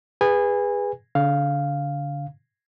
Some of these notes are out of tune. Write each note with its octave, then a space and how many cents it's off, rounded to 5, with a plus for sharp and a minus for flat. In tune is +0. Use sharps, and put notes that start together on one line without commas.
G#4 -25 B4 +0 G#5 -25
D3 -30 F5 +0